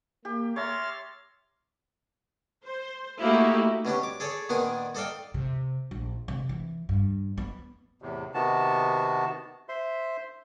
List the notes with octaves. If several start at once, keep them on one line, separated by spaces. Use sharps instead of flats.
A#3 G4
C#5 E5 A#5 C6 F6 A6
C5
A3 A#3 D#4 E4 F#4 G4
B2 C#4 D4 G4
D6
G#4 A4 C#5 D5
A#2 D#3 B3 D4 D#4 G#5
D#4 A4 D5 F5 G5
C3
A#1
C3
E3
G2
B3
E2 A2 C3
C3 D#3 B3 F#4 A5
C5 E5 C6